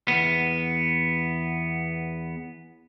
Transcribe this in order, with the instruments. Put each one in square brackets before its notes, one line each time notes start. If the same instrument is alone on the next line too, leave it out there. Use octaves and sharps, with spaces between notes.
[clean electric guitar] E2 B3